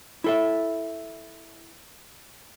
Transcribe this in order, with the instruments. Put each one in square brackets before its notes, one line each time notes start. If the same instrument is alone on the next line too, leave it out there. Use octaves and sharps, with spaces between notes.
[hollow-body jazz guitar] E4 A4 E5